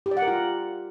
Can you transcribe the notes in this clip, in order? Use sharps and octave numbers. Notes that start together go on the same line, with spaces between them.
G4
D5
F#5
A#4
F4